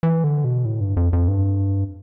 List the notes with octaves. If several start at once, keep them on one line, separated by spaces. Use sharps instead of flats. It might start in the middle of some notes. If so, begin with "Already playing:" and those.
E3
D3
B2
A2
G2
F2
F2
G2